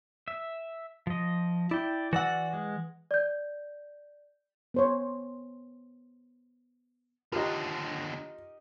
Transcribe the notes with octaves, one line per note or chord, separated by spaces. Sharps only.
E5
F3 D#5
E4 D5 G5
E3 F#4 D5 F#5 E6
G#3
D5 G6
B3 C5 C#5
D#2 D3 D#4 F4 G4 A#4